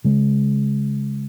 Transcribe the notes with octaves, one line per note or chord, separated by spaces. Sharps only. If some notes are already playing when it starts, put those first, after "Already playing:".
C#3 G#3